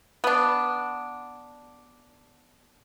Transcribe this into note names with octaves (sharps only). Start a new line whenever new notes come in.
B3 D4